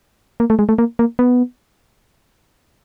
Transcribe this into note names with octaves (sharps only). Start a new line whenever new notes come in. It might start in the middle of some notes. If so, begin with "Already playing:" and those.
A#3
A3
G#3
A3
A#3
A#3
B3